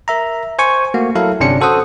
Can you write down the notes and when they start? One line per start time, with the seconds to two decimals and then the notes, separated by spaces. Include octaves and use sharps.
0.08 A#4 E5 A#5
0.59 C5 G#5 C#6
0.94 A3 A#3 F#4
1.15 F#3 E4 A4 A#4 F5
1.40 G1 C3 C#4 D4 C#7
1.61 F#4 A4 C5 F#5 D#6